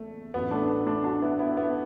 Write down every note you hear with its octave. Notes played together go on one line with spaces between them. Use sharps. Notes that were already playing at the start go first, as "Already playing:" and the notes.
Already playing: F#1 E2 A3
A1 A2 F#3 B3
A3 D4
B3
A3 D4
D4 F#4
B3 E4
B3 E4
B3 E4